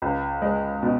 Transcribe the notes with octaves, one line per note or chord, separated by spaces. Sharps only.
C#2
G#3
B2